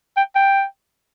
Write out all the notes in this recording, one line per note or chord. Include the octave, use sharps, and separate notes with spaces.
G5
G5